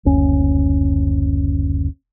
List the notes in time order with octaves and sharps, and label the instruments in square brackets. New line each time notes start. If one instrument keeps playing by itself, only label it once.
[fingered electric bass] F#1 D2 C#4